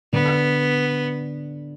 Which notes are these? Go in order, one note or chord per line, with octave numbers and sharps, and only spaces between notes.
D3 B3